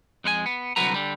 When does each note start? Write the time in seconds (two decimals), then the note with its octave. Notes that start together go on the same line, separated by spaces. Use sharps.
0.24 F2 G#3 A#4 G#5
0.46 B3
0.76 C2 D3 F#3 F#4 B4 A#5
0.94 D3 G3